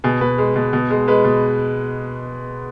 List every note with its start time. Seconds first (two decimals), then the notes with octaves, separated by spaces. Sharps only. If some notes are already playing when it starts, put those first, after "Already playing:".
0.04 B2 G#4
0.21 B2 B4
0.38 G#3
0.56 B2
0.73 B2
0.90 G#3
1.08 G#3 B4
1.24 B2